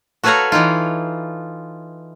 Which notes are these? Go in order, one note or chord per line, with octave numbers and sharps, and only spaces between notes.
F#4 A4 B4 C#5 F5 A#5
E3 D#4 F4